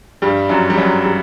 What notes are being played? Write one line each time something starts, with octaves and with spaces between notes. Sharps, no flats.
G2 G3
F#2 F#3
G3
F#2 F#3
G3